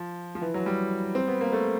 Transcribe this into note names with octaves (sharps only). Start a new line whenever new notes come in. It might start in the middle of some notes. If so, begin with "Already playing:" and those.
Already playing: F3
F3
E3
F#3
G3
C4
B3
A#3
A3